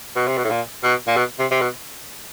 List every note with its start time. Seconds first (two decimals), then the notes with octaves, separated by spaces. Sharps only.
0.16 B2
0.28 C3
0.37 B2
0.44 A2
0.51 A#2
0.83 B2
1.07 A#2
1.16 B2
1.39 C3
1.51 C3
1.61 B2